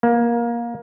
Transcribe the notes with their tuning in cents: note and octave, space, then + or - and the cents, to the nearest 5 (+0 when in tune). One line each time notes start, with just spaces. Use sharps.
A#3 +20